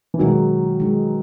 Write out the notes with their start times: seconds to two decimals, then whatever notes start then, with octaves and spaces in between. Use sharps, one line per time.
0.14 E3
0.19 B2 D#3 F#3 G#3 D#4
0.80 E3 G#3 D#4